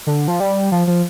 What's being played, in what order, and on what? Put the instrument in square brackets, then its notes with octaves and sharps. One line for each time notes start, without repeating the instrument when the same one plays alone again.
[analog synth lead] D3
F3
G3
F3
F3